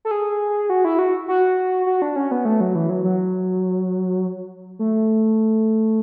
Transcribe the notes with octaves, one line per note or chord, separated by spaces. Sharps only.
A4
G#4
F#4
E4
F#4
F#4
F#4
D4
C#4
B3
A3
F#3
E3
F#3
F#3
A3